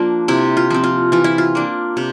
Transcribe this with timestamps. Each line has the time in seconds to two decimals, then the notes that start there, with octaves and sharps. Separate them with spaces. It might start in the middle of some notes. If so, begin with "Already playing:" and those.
Already playing: F3 A#3 D4
0.28 C3 E4
0.57 F4
0.70 F3 C4
0.84 F4
1.12 E3 F4
1.24 E4
1.38 F4
1.55 A#3 D4
1.97 C3